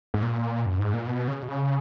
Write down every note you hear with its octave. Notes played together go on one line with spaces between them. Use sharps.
G#2
A#2
F#2
G#2
A#2
B2
C#3
B2
C#3